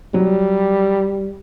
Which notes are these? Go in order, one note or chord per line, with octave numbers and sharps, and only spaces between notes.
F#3 G3